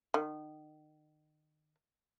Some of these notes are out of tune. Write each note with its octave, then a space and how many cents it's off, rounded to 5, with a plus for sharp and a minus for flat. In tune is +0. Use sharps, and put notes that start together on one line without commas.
D#3 -30